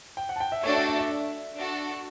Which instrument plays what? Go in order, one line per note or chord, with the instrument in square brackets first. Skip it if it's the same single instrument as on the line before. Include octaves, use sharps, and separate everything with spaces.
[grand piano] G5
F#5
A5
G5
E5
[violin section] A3 D4 F#4 A4 D5 [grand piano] C#5
[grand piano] E5
E5
E5
[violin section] D4 F#4 A4